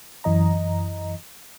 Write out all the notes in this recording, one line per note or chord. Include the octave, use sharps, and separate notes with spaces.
F#2 E3 D#5 A#5